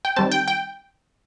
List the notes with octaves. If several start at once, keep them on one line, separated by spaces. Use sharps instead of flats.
G5
D#3 G3 C4 A5
G5
G5